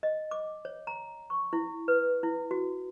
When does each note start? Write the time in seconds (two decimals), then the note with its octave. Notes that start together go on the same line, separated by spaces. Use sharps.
0.03 D#5
0.31 D6
0.65 C#5
0.87 A#5
1.30 C#6
1.53 E4
1.88 B4
2.23 E4
2.51 F#4